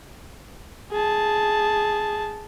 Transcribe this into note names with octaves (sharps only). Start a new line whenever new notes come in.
G#4 A5